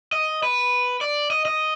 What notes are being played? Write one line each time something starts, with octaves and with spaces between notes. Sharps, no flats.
D#5
B4
D5
D#5
D#5